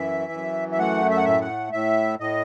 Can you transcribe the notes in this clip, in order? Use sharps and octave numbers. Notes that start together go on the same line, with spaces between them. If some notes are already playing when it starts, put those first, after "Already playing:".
Already playing: F#2 E3 E5
F#2
E5
A3 F#5
E5
F#5
A2 E5
F#5
A2 E5
A2 D#5